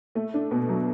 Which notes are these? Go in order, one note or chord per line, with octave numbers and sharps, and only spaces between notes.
A3
D4
B2
F#3